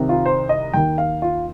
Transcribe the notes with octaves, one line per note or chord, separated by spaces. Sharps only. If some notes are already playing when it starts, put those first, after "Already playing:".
Already playing: C2 C3 D#3
F4
C5
D#5
D#2 D#3 G5
F5
F4